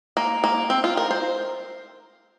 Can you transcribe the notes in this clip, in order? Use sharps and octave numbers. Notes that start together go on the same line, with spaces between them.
A#3
A#3
C4
F4
A#4
C5